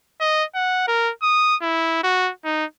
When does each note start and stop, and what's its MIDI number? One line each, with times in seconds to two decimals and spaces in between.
0.21 0.44 75
0.55 0.83 78
0.88 1.11 70
1.23 1.56 87
1.62 2.00 64
2.03 2.31 66
2.45 2.65 63